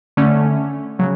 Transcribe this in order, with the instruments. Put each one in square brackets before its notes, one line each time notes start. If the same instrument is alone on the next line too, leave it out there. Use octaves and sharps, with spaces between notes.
[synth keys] D3 A3 C#4
C#3 F#3